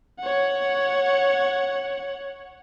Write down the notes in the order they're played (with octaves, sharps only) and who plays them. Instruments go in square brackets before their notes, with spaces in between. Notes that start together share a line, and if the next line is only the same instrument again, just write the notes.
[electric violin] C#5 F#5